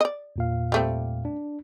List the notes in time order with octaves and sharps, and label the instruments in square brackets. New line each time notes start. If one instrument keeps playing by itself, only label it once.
[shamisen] D5 D#5
[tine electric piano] E2 A#2 F5
[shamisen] G3 A3 C4
[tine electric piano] D4